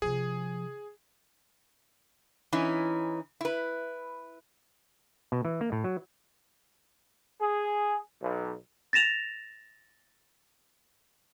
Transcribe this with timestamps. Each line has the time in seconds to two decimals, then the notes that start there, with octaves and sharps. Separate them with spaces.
0.02 C3 F3 G#4
2.53 E3 C#4 D#4 E4
3.41 E4 B4
5.32 B2
5.45 E3
5.61 A#3
5.72 A2
5.84 F#3
7.41 G#4
8.22 B1
8.93 A6 A#6 E7 F7